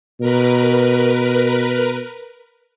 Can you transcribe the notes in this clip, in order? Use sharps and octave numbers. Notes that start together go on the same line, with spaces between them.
B2 A#4 B4